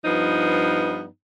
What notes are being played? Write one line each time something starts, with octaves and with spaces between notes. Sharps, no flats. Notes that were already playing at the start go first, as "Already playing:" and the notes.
G2 F3 B3 D#4